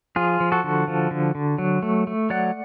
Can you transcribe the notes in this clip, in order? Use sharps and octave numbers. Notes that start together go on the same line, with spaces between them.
F3 F4 G#4
F3
F#4 A4
D3
F3
D3
D3
F#3
A3
A3
F#3 D5 F#5